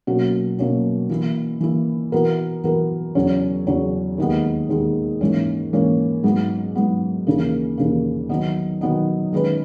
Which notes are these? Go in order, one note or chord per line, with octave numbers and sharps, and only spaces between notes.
B2 F#3 A#3 C#4 F#4
B2 F#3 A#3 C#4 F#4
E3 A#3 E4
E3 A#3 E4
E3 B3 F#4 A#4
E3 B3 F#4 A#4
E2 C#3 F#3 C#4
E2 C#3 F#3 C#4
D#2 D#3 G#3 B3
D#2 D#3 G#3 B3
G#2 E3 A#3 C#4
G#2 E3 A#3 C#4
G#2 F#3 B3
G#2 F#3 B3
D#2 C#3 E3 A#3
D#2 C#3 E3 A#3
D#3 F#3 B3 D#4
D#3 F#3 B3 D#4
D#3 G#3 C#4 G#4 B4